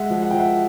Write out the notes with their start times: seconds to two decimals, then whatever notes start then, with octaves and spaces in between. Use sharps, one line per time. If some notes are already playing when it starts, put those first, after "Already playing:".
Already playing: G#3 E5 F#5
0.10 F3
0.22 F#5
0.31 F3 G5
0.39 E5 F#5